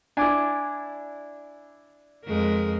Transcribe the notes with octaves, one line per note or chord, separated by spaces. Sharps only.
D4 E4 G#5 D6
F2 G#3 A#4